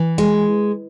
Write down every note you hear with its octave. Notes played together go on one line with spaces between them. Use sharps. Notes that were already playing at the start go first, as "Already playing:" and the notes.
Already playing: E3
G#3